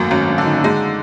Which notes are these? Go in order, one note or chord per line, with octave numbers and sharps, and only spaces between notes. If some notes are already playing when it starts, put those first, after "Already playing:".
Already playing: G#1 F#2 A3 A#3
G#1 C#4
D4
D3
D#4
D4
G#3 D#4